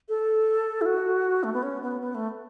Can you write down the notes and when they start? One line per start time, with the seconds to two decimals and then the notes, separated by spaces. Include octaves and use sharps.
0.09 A4
0.81 E4
0.86 F#4
1.44 A3
1.54 B3
1.63 C#4
1.82 B3
2.01 B3
2.15 A3